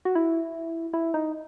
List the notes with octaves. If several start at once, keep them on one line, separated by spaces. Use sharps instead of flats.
F#4
E4
E4
D#4